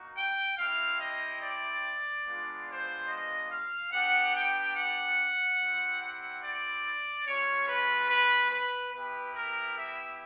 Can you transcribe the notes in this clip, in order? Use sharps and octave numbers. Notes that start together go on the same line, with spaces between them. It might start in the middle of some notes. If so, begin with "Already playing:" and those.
Already playing: A#3 D#4 F#4
G5
C4 E4 G4 F5
D#5
D5
G#3 B3 D4 F4
C5
D#5
F5
B3 D4 G4 F#5
G5
F#5
G3 C4 E4
F#5
D5
G#3 C#4 F4 C#5
B4
B4
B4
B3 E4 G4 B4
A#4
E5